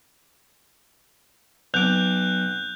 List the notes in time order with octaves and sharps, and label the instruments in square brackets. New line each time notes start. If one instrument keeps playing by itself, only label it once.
[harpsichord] B1 D6 [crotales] F#6 G6 F7